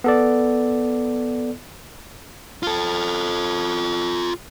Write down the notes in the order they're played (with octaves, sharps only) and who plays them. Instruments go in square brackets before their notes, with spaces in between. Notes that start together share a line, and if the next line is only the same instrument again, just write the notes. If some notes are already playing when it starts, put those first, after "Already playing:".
[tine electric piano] B3 A4 D5
[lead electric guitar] F4 A4